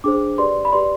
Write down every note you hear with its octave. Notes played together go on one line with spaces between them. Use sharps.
D4 G#4 C5 D6
G4 B4 D5 C6
B5
G4 B4 D5 C6